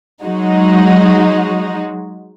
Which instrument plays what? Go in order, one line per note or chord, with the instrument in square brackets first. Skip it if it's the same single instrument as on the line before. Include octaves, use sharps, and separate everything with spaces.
[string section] F#3 G#3 D#4 F#4